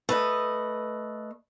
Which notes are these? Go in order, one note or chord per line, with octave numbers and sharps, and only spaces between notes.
A3 B4 D#5